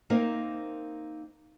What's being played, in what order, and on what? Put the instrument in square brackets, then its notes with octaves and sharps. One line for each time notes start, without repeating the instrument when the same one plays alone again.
[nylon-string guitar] A#3 C4 D#4 A#4 C5 E5